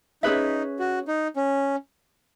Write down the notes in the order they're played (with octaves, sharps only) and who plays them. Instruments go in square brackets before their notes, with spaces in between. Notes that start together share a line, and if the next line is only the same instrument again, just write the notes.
[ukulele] C#4 G#4 B4 E5 [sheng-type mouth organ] D#4
[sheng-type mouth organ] F#4
D#4
C#4